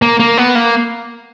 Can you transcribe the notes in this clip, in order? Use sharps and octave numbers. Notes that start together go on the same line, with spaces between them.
A#3
A#3
B3
A#3